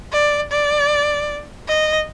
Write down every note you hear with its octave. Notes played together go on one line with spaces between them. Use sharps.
D5
D5
D#5